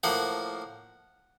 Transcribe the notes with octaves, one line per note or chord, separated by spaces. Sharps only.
A2 F3 A#3 F#5